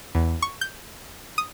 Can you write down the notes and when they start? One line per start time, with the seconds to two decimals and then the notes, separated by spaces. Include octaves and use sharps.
0.15 E2
0.42 C#6
0.61 G6
1.38 D#6